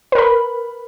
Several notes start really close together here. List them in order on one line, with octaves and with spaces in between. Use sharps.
B4 A#4 B5